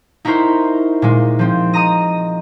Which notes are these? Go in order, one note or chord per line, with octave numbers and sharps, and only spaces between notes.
D#4 E4 F#4 A#4 C5
A#2 G#3
F3 C4
D#5 A#5 D#6 D#7